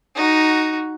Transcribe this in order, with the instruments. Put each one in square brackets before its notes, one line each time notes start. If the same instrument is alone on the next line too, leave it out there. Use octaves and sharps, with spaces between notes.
[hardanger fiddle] D#4 F#4